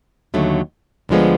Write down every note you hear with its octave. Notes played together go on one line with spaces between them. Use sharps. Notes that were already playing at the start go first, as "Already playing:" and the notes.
D#2 D3 F#3 A3
D2 D3 F3 G#3 B3